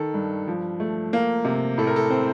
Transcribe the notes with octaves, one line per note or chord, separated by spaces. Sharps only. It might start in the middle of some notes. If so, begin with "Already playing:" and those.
Already playing: D#3 A4
G2
F3
A3
A#3
C3
A2 A4
A#4
A4
C4 C5